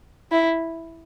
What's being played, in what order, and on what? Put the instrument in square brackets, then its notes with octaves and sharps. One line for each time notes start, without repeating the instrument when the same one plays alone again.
[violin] E4